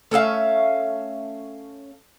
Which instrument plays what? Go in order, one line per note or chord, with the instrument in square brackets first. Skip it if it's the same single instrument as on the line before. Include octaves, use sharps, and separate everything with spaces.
[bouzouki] A3 C#4 E5 F5